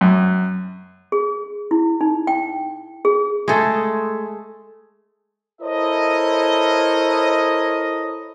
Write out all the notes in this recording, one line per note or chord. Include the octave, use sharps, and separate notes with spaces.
F#2
G#4
E4
D#4
G5
G#4
G#3 A3 G#4 A4
E4 A4 A#4 C5 C#5 D#5